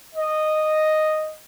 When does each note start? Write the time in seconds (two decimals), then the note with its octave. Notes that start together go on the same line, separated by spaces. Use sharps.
0.15 D#5